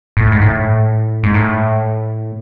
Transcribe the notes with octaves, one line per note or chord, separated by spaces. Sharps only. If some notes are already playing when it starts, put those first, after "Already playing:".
A2
G#2
A2
G#2
A2